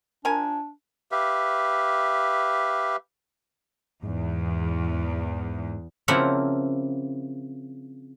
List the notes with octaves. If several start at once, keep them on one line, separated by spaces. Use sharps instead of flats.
F3 D4 A#4 G#5
G4 B4 E5 F5
E2 G#2
C#3 F3 A#3 C4 E4 F#5